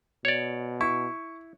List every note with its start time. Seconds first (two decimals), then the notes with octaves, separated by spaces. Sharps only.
0.25 B2 C#5 D5
0.81 E4 C#6